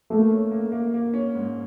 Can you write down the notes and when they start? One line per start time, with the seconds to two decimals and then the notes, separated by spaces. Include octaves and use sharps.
0.10 A3 A#3
0.31 C#4
0.51 A#3
0.72 A#3
0.94 A#3
1.14 C#4
1.35 G#2